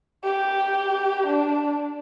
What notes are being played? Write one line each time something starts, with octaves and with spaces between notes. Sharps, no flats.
G4
D4